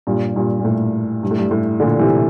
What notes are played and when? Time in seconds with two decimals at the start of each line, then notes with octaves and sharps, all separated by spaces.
0.07 G2 A#2
0.36 G2 A#2
0.60 A#2
0.65 A2
1.23 G2
1.31 A2
1.38 G2
1.51 A2
1.80 A#2 D3
1.99 C3 E3